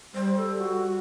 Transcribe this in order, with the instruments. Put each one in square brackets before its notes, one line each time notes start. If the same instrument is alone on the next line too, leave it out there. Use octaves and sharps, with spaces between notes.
[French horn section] G3 [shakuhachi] C5
[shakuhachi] A4
F#4